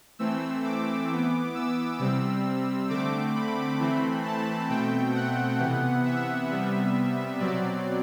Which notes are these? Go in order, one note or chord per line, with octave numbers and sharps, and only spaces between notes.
E3 A3 C4 E6
D6
E3 B3
E6
C3 G3 C4 E6
D3 A3 C4 D6
B5
E3 A3 C4
A5
B2 A3 C4 G5
F#5
C3 E3 B3
E5
C3 G3 B3
B2 F#3 C4 D5